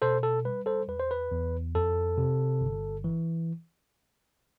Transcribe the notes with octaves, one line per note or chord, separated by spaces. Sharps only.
B2 A4 C5
A4
G3 B4
A4 C5
E2 B4
C5
B4
E2
F2 A4
C3
G1
E3